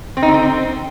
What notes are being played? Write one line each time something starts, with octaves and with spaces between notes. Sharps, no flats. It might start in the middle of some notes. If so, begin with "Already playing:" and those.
C4
D#4
D3
C4